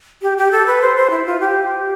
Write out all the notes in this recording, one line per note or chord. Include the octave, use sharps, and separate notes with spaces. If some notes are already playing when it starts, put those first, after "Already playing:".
G4
G4
A4
B4
C5
C5
E4
F4
G4